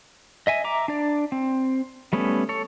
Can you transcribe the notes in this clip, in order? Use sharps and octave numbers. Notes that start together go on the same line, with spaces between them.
D#5 E5 G#5
E5 A#5 D6
D4 D5
C4
G3 A3 B3 C#4
A4 C#5